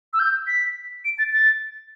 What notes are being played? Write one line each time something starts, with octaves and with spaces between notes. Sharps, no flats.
E6
G6
B6
D7
A6
A6